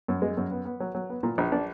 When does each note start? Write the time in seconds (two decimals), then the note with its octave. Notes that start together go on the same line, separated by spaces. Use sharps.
0.08 F#2
0.22 G#3
0.37 F#2
0.51 B3
0.65 B3
0.80 F#3
0.95 F#3
1.10 B3
1.23 A#2
1.38 A#1
1.52 D4